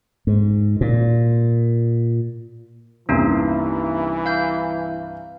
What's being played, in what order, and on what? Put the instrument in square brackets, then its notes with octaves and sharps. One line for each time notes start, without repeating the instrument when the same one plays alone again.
[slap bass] G#2
A#2
[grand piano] C2 G2 C3 [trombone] E3 [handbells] A#3 C#4 D#4
[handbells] F5 G6